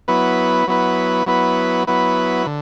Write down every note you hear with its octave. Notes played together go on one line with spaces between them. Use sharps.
F#3 B3 E4 B4
F#3 B3 E4 B4
F#3 B3 E4 B4
F#3 B3 E4 B4
D3